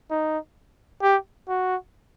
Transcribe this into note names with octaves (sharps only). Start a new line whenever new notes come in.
D#4
G4
F#4